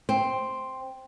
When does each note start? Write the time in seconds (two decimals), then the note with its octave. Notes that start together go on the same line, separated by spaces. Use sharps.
0.09 C4